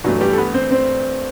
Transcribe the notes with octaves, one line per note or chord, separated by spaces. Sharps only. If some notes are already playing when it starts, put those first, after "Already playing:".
G2 E3 F#3 A3 F#4
G3 G4
A4
B3 B4
C4 C5
C4 C5